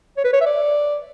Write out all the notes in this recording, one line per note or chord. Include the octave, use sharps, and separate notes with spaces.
C#5
B4
C#5
E5
D5